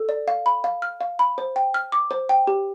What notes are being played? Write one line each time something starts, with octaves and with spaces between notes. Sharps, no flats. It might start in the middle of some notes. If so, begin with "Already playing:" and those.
Already playing: A4
D5
F5
B5
F5
F6
F5
B5
C5
G5
F6
D6
C5
G5
G4